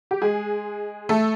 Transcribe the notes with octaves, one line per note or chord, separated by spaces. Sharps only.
G4
G#3 G#4
A3 A4